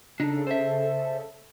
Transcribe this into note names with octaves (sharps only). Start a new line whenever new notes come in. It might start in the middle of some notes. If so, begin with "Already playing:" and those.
C#3 D4 D#4 A4
C5 E5